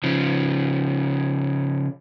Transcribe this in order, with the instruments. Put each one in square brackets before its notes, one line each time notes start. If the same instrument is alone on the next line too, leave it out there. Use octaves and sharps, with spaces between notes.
[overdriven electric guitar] C#3 F3